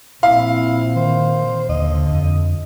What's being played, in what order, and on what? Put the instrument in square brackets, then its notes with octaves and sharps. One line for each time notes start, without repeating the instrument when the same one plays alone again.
[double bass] A#1 C4 [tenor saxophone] E4 [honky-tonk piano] F5
[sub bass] D#3 [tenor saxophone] C5
[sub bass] D#2 [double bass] D3 [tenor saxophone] D#5
[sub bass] F2